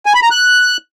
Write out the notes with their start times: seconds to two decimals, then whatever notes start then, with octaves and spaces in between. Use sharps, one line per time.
0.06 G#5
0.14 B5
0.23 A#5
0.31 F#6